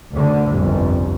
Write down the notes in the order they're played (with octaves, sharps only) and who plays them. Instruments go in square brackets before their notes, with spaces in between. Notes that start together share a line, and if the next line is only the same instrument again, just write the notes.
[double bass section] D2 D3
G1 C2 F2